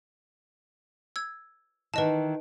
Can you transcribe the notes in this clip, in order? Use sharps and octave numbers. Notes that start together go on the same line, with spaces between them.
E6 G#6
D#3 E3 B4 D#5 A5